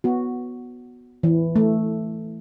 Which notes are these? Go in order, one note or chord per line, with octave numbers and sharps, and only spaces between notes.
B3 F#4
E3
A3